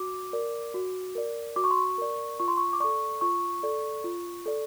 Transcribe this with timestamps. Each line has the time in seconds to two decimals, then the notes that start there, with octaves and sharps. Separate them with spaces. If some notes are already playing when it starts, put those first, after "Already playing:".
Already playing: F#4 D6
0.33 A#4 D5
0.74 F#4
1.15 A#4 D5
1.56 F#4 D6
1.64 C#6
1.71 C6
1.77 C#6
1.98 A#4 D5
2.40 F4 C#6
2.48 C6
2.57 C#6
2.73 D6
2.80 A4 D5 C#6
3.21 F4 C#6
3.63 A4 D5
4.04 F4
4.46 A4 D5